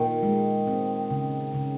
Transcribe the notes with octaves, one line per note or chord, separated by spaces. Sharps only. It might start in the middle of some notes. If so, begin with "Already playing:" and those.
Already playing: A#2 D#3
G#3
C4
C#3
C#3